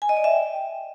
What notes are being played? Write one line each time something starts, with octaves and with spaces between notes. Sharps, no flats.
G#5
D#5
D5
E5
G5